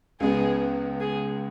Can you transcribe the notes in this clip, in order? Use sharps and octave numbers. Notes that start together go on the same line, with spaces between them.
C#2 C#3 G#3 B3 G#4
G#4